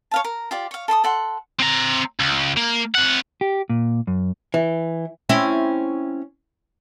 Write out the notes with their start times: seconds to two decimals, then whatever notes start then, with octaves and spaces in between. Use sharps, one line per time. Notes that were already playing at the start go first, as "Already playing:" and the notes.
0.11 C#5 F5 A5
0.24 A#4
0.51 F4 G4 D5
0.71 C#5 F5
0.88 A4 A5 C6 D#6
1.04 A4 F#5 C6
1.60 C4 A#5
2.20 C#2
2.57 A#3
2.95 C3 F#5
3.41 G4
3.70 A#2
4.07 F#2
4.54 E3
5.29 C4 C#4 E4